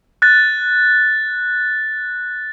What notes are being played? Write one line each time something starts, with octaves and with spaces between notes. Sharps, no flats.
F#6 A6